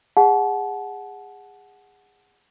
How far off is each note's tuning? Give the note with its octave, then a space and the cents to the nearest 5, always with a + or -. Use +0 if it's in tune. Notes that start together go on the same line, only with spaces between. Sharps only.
G#4 -25 F#5 +0 A5 -35